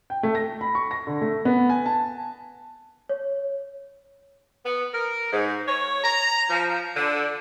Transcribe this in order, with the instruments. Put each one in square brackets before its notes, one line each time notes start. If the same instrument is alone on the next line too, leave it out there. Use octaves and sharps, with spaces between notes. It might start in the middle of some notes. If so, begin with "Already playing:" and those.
[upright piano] G5
A3
A#6
B5
C#6
A#6
D3
A3
B3
G#5
A5
[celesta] C#5
[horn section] B3
A#4
G#2
C#5
A#5
F3
D3